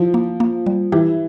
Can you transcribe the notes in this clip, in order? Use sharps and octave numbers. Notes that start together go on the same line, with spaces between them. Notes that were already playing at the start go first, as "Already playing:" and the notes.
Already playing: F3 E4
A#3
A#3
G3
E3 G4